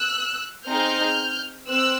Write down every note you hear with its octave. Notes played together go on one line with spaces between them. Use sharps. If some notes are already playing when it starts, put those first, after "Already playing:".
Already playing: E6 F#6
C4 D#4 G#4 F6 G6
C4 E6 F#6